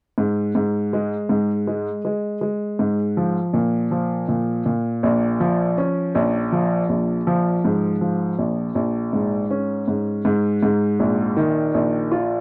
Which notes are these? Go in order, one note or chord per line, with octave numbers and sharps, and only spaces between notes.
G#2
G#2
G#3
G#2
G#3
G#3
G#3
G#2
F3
A#2
F3
A#2
A#2
A#1
F3
C#4
A#1
F3
A#1
F3
G#2
F3
A#1
A#1
G#2
C#4
G#2
G#2
G#2
A#1
D#3
A#1
F4